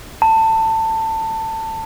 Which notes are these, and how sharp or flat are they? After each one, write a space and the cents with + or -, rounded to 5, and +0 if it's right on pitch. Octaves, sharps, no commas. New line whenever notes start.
A5 +20